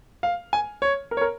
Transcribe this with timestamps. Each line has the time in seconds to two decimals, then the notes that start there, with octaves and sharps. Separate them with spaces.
0.23 F5
0.53 G#5
0.82 C#5
1.11 A#4
1.17 C#5
1.21 A#4